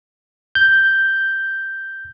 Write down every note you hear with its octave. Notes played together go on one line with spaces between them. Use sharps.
G6